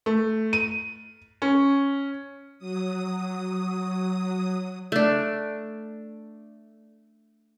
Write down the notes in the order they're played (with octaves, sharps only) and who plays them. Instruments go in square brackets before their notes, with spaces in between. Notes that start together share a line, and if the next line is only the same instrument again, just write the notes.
[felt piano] A3
D#7
C#4
[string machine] F#3 D#6
[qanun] A3 D4